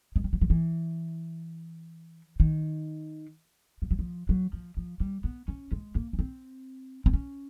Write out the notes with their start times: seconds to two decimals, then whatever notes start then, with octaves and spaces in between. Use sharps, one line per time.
0.16 G#3
0.24 G3
0.33 F#3
0.41 F3
0.50 E3
2.40 D#3
3.82 F3
3.91 F#3
3.99 F3
4.29 F#3
4.53 F3
4.77 F3
5.00 G3
5.24 B3
5.48 C#4
5.72 G#3
5.95 A#3
6.13 C#4
6.19 C4
7.06 C4
7.14 C#4